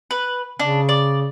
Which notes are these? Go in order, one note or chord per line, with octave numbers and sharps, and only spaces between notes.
B4
C#3 D4
D5